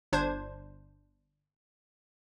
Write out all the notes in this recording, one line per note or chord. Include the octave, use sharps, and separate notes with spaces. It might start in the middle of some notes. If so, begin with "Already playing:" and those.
G1 D4 C5 G#6